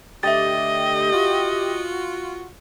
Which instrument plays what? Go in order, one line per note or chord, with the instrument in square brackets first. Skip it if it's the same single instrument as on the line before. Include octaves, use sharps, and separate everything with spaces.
[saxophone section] D3 A3 [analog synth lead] G4 [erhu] D#5 [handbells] E5 A6
[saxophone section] F4 F#4